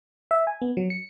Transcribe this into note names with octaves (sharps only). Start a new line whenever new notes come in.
E5
G#5
B3
F#3
C#7